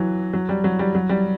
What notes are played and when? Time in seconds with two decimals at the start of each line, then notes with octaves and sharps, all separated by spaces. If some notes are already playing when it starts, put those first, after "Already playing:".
Already playing: E3 F#3
0.33 F#3
0.49 G3
0.64 F#3
0.79 G3
0.95 F#3
1.09 G3